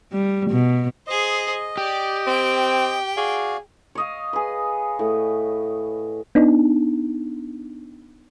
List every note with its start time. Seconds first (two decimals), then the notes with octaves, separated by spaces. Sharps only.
0.12 G3
0.51 B2
1.07 G#4 C5 D#5
1.77 G4 D5
2.27 C4 G5
3.17 F#4 G#4 D5 F5
3.95 C#5 D#5 F5
4.33 G#4 B4
4.99 A2
6.35 B3 D4 D#4